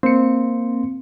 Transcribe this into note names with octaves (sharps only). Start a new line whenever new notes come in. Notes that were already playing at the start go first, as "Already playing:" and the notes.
A#3 C4 C#7